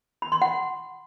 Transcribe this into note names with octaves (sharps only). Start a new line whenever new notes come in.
B5
C6
F#5